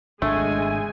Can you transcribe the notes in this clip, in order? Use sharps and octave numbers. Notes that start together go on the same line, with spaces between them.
G#1 C#3 G#3 A3 D4 G#5